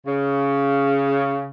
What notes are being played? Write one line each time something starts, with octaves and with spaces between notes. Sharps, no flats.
C#3